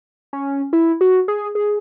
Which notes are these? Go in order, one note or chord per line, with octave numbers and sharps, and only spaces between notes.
C#4
E4
F#4
G#4
G#4